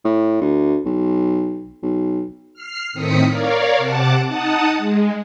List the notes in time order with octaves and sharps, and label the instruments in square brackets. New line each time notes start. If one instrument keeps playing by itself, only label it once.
[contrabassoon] A2
D2
B1
B1
[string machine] F6 C7
A2 D#3 C4 D#6 B6 C#7
A#4 C#5 D5 F5
C3 F#5 A5 D6
D#4 F#5 A5 D#6
G#3